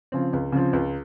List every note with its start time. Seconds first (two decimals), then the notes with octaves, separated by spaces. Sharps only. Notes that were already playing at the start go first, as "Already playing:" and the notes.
0.12 C#3 F3 C4
0.33 C#2
0.52 C#3 F3 C4
0.73 C#2